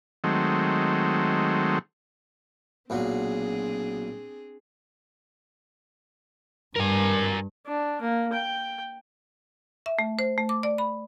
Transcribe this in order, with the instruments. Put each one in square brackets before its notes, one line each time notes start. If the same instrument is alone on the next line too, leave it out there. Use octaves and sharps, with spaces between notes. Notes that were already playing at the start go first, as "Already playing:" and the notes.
[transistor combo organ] D#3 F#3 G#3 A3 C4
[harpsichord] B1 A#2 F#3 [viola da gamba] C4 D4 G#4
[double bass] G2 [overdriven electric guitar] A#4 G#5
[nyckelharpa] D4
A#3
G5
[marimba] E5
A3
C5
A3
D6
D5
B5